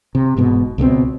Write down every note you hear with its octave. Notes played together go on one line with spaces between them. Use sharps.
C3
E1 G#2 B2
C#2 B2 G#3 C4